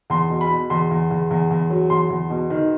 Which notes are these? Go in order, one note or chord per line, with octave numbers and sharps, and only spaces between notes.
E2 C6
B2
B5
B2
E2 C6
E2
E2
E2
E2
F#3
E2 C6
E2
B2
D#3